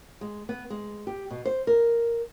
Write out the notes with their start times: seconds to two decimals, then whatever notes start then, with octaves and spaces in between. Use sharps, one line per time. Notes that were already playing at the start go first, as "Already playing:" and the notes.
0.21 G#3
0.49 B3
0.70 G#3
1.07 G4
1.30 B2
1.45 C5
1.67 A#4